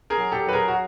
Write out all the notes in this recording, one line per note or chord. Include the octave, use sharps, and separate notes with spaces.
G#4 A#4
F#3
G4 A4
F#3 B4
G#4 A#4
F#4